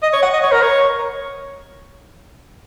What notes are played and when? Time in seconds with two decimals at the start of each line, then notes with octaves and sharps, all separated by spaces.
0.03 D#5
0.13 C#5
0.22 F#5
0.33 D#5
0.43 C#5
0.52 A#4
0.62 C#5